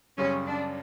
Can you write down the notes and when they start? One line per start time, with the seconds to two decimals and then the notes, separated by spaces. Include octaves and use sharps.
0.18 F#2 C#3 G3 C#4
0.46 D4